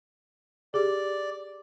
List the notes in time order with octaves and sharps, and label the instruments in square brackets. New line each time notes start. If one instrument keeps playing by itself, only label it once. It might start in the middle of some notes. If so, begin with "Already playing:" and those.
[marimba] G4 G#4 [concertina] D5